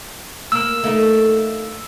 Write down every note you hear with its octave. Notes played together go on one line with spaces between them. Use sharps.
A#3 A#4 E6
A3 A#3 D#4